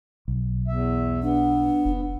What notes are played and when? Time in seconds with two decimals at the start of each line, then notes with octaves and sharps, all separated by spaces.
0.28 B1
0.68 E2 E5
1.23 B3 D4
1.85 F1